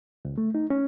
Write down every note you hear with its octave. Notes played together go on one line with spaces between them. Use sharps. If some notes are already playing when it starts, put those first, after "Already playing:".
C#2
A3
D#4
C#4